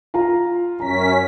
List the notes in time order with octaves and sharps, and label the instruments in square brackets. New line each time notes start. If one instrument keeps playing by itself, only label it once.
[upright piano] F4 F5 A#5
[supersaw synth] F#2 C#4 B6 [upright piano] A#5